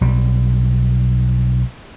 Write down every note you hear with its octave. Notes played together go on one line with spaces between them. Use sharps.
B1 G3